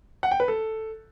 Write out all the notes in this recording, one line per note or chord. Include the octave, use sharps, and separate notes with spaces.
F#5
G5
B4
A4